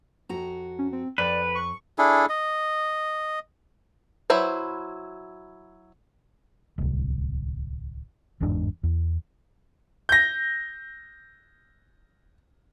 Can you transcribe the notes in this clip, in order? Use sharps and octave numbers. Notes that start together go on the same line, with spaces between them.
F2 F#4 A#5
C#4
C4
F2 B4 D5
C#6
D4 E4 G#4 A4
D#5
F#3 E4 B4 C5
D1 C2
G1 E2 G#2 D4
E2
G6 A#6